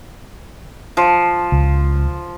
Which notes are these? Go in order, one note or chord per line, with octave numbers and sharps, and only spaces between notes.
F3
C#2